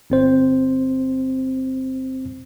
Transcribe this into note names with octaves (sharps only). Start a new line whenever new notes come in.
G1 C4 C5